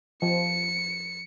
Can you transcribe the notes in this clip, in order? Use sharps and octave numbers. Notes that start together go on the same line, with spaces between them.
F3 C#7